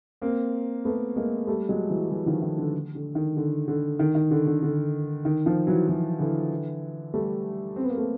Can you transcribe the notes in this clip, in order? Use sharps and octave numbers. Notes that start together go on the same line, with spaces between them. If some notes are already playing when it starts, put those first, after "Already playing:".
A#3 C4
A3 B3
G#3 A#3
G3 A3
F#3 G#3
E3 F#3
E3 F#3
D#3 F3
D#3
D3
D3
D#3
D3
D3
D#3
D#3
D3
D3
D3
D#3
D#3 F3
E3 F#3
E3 F#3
D3 E3
G3 A3
C4
B3
A#3
A3 B3